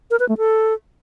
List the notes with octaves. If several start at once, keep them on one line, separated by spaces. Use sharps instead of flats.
A#4
B4
A3
A4